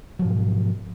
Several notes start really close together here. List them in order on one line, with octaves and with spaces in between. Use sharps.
F#3 F3 G#2 B2